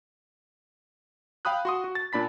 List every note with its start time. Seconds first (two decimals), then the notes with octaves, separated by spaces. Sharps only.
1.45 F5 G5 B5 D#6 F#6
1.65 F#4 C6 D#6
1.84 F#4
1.95 A6
2.13 A#2 D4 B5 B6